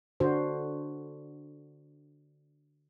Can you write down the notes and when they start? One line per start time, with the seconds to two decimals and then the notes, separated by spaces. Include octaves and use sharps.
0.20 D3 D4 F#4 C5